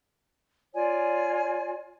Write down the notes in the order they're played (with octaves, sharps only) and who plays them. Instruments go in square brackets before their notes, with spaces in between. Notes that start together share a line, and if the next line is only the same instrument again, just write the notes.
[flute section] F4 C#5 D5 G#5